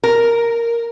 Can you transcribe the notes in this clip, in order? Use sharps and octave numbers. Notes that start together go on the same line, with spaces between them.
A#4